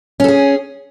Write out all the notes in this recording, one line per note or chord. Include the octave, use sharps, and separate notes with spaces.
C#4 G#4 A4